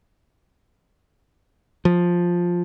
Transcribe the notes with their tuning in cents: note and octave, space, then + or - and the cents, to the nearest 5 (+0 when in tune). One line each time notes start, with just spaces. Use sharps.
F3 +5